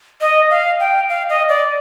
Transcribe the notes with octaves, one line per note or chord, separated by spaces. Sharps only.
D#5
F5
G5
F5
D#5
D5